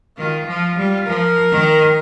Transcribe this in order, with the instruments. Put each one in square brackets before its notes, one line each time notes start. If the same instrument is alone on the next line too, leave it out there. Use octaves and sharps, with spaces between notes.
[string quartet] D#3 [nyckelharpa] F4
[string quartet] F3
G3
[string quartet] F3 [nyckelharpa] A#4
[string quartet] D#3